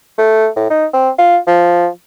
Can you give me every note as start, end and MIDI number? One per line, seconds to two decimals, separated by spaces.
0.18 0.48 57
0.56 0.68 45
0.70 0.86 63
0.94 1.10 60
1.18 1.38 65
1.47 1.88 53